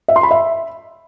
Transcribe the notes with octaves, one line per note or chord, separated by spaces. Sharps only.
E5
C6
B5
E5